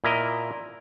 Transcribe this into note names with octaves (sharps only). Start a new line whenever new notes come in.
A#2 E4 A#4 D#5